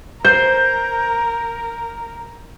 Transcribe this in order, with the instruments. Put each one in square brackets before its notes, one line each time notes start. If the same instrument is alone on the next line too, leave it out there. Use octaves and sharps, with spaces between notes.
[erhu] A#4 [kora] C5 [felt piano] G6